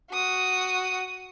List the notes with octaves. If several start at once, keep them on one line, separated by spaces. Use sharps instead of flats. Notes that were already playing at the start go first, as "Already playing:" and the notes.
F#4 D#6